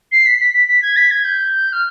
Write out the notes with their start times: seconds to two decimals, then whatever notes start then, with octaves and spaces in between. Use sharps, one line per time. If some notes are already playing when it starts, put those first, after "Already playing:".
0.12 C7
0.26 B6
0.40 B6
0.54 B6
0.68 B6
0.82 G#6
0.96 B6
1.11 G#6
1.24 G6
1.72 F6